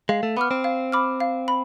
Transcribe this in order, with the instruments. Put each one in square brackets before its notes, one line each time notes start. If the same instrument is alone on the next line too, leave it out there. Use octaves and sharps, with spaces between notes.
[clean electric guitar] G#3 [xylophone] F5
[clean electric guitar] A3
[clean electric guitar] B3 [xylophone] B5 D6 F6
[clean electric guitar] C4
[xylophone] F5
B5 D6 F6
F5
B5